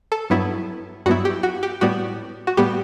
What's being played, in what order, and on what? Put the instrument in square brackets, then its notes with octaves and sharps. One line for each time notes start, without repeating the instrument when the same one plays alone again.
[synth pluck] A4
G2 F#3 B3 E4
G2 F#3 B3 E4 F#4
G4
F#4
G4
A2 G3 B3 F#4
F#4
A2 G3 B3 G4